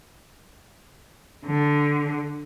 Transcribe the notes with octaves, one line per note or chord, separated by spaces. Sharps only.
D3